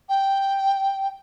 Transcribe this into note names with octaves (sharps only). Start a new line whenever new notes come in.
G5